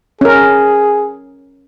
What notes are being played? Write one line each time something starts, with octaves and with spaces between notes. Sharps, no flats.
C#4 G#4 A#4